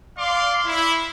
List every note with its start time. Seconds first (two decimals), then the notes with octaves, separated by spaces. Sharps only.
0.18 D5 F5 C6 D6
0.65 E4